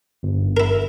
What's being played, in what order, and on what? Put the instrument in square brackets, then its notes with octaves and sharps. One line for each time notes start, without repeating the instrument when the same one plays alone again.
[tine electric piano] G1
[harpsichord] E4 A#4